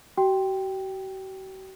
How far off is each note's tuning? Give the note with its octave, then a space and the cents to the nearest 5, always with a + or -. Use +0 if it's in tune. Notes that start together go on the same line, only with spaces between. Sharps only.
F#4 +45 G5 +0